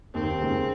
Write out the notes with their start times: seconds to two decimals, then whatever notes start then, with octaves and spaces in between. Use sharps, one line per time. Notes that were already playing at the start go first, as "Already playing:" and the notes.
0.14 D#2 D#3 C4
0.41 C#2 C#3